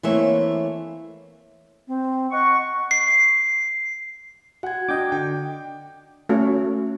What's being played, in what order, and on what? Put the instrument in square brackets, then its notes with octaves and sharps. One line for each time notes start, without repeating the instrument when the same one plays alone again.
[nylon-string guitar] E3 A3 A#3 C4 C#5 E5
[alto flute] C4
[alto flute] D#5 [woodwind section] F#5 C#6
[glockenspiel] C7
[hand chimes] F#4 G#6 [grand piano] F#5
[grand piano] D4 [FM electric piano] D#5 G5 D6
[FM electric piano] D3 [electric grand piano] G5
[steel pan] A3 C#4 F#4